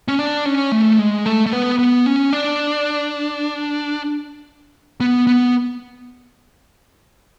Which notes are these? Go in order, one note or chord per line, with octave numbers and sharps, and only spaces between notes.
C#4
D4
C#4
A3
G#3
A3
A3
B3
B3
C#4
D4
B3
B3